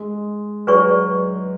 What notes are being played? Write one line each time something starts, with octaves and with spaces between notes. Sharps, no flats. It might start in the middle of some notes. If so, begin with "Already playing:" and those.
Already playing: G#3
F#3 G#4 B4 D5 G#5 C#6